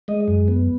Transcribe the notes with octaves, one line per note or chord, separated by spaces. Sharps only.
G#3 D#5
F#2
B3